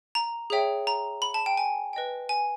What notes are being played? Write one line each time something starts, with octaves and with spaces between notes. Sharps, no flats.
A#5
G#4 C#5 E5 G5
A#5
B5
A5
G5
G#5
B4 D#5 G5
G#5